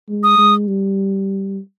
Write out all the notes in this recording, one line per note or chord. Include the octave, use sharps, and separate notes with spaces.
G#3
D#6
G#3
G3